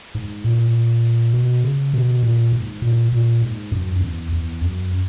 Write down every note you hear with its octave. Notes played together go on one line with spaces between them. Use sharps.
G#2
A#2
B2
C#3
B2
A#2
G#2
A#2
A#2
G#2
F#2
F#2
E2
E2
F#2